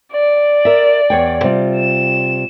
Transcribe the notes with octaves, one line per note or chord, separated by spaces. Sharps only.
D5
A#4 E5
E2 C#5 G5
C3 G3 F4
E7